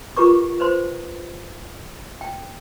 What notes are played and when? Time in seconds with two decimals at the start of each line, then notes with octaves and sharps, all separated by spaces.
0.17 F4 G4 A#4 B4 C#6 D6
0.60 B4 C5 C6
2.21 G5